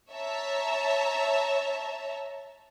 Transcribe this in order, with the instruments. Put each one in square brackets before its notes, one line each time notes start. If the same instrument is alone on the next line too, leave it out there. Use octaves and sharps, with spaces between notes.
[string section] C#5 E5 A5 A#5